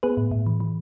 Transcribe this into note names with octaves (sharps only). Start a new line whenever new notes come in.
B3 G#4 B4
A2
A2
E3
E3